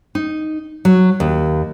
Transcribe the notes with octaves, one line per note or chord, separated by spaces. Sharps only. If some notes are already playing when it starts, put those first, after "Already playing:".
D#4
F#3
D#2